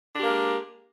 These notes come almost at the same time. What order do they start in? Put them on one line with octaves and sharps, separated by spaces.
D4 G4 A#3 A#4 G#3